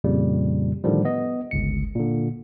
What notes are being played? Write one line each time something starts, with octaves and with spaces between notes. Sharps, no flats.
F2 A#2 C#3 G3
A2 D3 D#3 F3 G3
B3 D#5
G1 C#2 C#7
A#2 D3